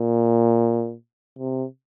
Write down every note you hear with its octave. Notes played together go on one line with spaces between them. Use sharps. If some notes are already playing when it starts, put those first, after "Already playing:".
Already playing: A#2
C3